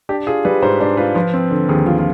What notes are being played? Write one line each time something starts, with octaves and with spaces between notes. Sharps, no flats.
D4 G4
F4 G#4
G3 B4
G#2 C5
D4 C5
F4 B4
F3 B4
C4
D3
D#2 G#4
F3 F4
F4